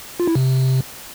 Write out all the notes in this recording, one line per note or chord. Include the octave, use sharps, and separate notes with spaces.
F4
E4
C3